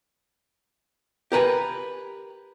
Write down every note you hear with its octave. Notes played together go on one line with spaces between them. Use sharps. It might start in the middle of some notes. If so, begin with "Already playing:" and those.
G4 A#4 B4 G#5